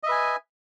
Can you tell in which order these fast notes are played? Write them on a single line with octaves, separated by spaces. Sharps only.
D#5 E5 B4 G#5